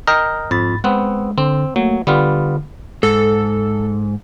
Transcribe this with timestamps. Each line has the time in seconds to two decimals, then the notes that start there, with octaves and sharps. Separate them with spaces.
0.07 A#4 D#5 G5
0.51 F2 G#2 B5 A6
0.84 G#3 B3 C4 F#5
1.38 D3 C4
1.76 F#3 A3 A#3
2.07 D3 G3 B3 F4
3.03 G#2 A4